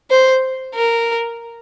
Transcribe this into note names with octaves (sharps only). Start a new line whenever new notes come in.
C5
A#4